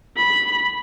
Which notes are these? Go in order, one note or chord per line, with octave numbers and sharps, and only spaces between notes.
B5